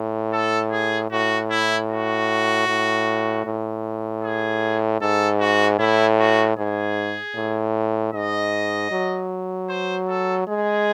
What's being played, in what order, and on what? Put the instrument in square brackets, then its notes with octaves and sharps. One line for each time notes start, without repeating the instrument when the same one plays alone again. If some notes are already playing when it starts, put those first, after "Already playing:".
Already playing: [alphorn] A2
[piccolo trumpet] A4
G#4
[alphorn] A2 [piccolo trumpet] F#4
[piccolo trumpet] E4
F#4
[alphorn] A2
A2
[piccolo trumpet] G#4
[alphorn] G#2 [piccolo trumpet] A4
[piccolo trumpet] F#4
[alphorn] A2 [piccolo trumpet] E4
[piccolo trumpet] F#4
[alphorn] G#2 [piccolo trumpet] G#4
[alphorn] A2
[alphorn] G#2 [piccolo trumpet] D#5
[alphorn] F#3
[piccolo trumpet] C5
A4
[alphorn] G#3 [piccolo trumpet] G#4